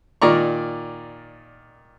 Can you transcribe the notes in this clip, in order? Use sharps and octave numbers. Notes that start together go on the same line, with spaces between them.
A#2 D#3 D5 A#5 C#6